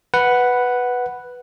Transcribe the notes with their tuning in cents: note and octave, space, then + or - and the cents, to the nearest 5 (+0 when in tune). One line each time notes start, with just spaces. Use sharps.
B4 +0 F#5 +0